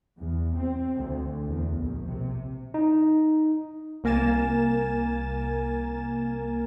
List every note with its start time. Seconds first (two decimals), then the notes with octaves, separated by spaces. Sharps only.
0.19 E2
0.57 C4
0.96 D2
1.48 E2
1.77 A#1
2.09 C3
2.74 D#4
4.04 C2 A#3 A#4 G#5 A6 E7